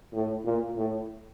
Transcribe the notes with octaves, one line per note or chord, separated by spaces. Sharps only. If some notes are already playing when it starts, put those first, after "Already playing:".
A2
A#2
A2